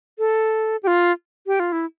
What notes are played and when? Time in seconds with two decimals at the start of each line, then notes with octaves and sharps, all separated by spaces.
0.19 A4
0.83 G4
0.87 F4
1.47 G4
1.60 F4
1.72 E4